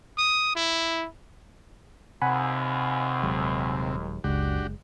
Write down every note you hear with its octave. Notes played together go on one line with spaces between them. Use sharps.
D#6
E4
D#2 C3 F#5 G#5 B5
D#1 F#3 G#3
F#1 C#2 G#3 D4 F#4 G4